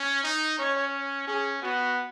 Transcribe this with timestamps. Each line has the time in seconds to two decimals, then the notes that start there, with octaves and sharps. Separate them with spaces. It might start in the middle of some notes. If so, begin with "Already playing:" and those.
Already playing: C#4
0.24 D#4
0.59 C#4 C#5
1.27 C#4 G#4
1.62 B3 F#4